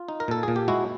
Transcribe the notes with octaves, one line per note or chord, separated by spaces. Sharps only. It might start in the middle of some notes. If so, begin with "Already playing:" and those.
Already playing: F4
D#4
A#4
A#2 A4
A#2 G#4
G4
G#3 E4 F#4